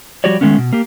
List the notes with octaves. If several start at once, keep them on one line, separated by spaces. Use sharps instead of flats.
F3 G3 F#4 G4 C#5 D5
D#3 G#3 A3 B3 C#4
B2
A#3 G4